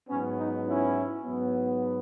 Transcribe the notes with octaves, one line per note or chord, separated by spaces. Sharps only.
G#2 F#3 B3 C#4
D#4
C#4 E4
G#2 F#3 B3